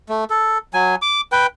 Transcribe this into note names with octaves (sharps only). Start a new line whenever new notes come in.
A3
A4
F#3 G#5
D6
B4 G5